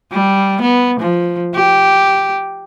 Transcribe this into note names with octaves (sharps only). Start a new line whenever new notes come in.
G3
B3
F3
G4